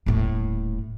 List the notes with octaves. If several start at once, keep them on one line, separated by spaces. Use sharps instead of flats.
D#1 A2